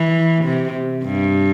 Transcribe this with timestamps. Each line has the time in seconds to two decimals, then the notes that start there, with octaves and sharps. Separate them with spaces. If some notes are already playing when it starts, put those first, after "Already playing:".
Already playing: E3
0.44 C3
1.04 G2